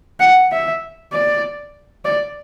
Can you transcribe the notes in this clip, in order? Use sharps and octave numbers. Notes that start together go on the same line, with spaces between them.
F#5
E5
D5
D5